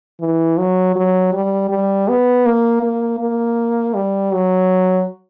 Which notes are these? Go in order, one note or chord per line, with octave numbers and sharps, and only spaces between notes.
E3
F#3
F#3
G3
G3
B3
A#3
A#3
A#3
G3
F#3